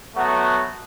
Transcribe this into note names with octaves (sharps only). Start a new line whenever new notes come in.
F#3 A3 B3 F#4